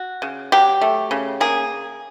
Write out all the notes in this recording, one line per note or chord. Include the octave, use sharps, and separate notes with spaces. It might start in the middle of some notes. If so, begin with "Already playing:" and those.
Already playing: F#4
C#3
F#3 G4
A3
C#3
A#3 G#4